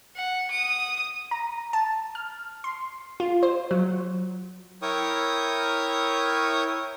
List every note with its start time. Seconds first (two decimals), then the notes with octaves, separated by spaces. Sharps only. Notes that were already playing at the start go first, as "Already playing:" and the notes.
0.16 F#5
0.51 D#6
1.31 A#5
1.73 A5
2.15 F6
2.64 C6
3.20 F4
3.43 C5
3.71 F#3
4.82 E4 A#4 C#5 G5 C#6 D#6